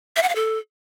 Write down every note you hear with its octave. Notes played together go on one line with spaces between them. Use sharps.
E5
F#5
F5
A4